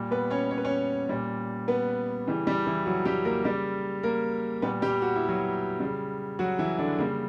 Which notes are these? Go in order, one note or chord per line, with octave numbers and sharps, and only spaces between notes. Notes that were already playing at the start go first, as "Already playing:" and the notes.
Already playing: A#2 G3
B3 B4
C#4 C#5
C#5
B4
C#4 C#5
A#2 G3
B3 B4
C#3 E3 G3
G3 G4
E3 E4
F#3 F#4
G3 G4
A#3 A#4
C#3 G3 G4
A#3 A#4
A#2 G3 B3 B4
G3 G4
F#4
E4
F#3 F#4
C#3 G3
F#3 F#4
E3 E4
D3 D4
C#3 G3 A#3